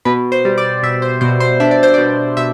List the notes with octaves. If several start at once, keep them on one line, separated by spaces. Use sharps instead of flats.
B2 B4
C5
G3
D5
B2 E5
C5
B2 C5
C5
D4 E5
D5
C5
B2 D5
B2 E5